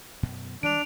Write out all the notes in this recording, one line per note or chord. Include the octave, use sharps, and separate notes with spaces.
F#2 B2
D#3 G3 G#3 D4 D7 F7